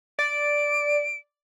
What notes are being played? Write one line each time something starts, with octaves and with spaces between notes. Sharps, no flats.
D5 D7